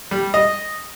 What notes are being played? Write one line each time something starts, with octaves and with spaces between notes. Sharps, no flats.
G3
D#5